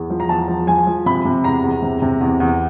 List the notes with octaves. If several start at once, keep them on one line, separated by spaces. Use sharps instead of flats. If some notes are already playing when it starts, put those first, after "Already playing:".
Already playing: E2
F3
A#5
E2 A5
F3
F3 G#5
F3
C3 B5
C3
E2 A#5
E2
C3
C3
E2
E2